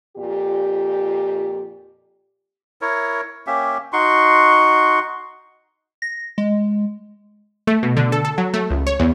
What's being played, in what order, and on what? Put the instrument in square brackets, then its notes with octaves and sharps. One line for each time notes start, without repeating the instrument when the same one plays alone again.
[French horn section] F2 A#2 G4
[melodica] E4 A#4 C#5
A#3 C#4 G4 E5
D#4 F#4 C6 C#6
[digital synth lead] A#6
G#3
[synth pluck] A3
B2
D3
A4
A4
F#3
A3
C#2
C#5
E2